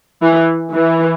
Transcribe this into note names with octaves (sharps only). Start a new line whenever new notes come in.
E3
E3